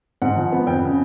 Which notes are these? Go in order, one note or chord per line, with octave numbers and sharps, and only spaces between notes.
G#2 F#5
F3
B3
F2 G5
C#3